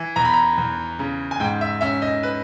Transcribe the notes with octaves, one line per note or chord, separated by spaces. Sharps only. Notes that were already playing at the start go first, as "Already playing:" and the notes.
Already playing: E3
E2 A#5
B5
A#5
E2
C#3
G#5
G#2 G5
E5
C#4 E5
D#5
B4